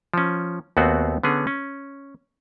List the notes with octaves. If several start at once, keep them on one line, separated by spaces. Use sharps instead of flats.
F3 C#4
D#2 A3 B3 C4 F#4
D3 B3 C#4 G#4
C#4